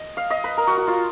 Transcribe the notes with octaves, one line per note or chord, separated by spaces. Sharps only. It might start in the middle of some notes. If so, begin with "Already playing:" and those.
Already playing: D#5
F5
D#5
B4
A#4
F#4
F#4
F4